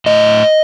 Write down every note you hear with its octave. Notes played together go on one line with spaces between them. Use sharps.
A2 D#5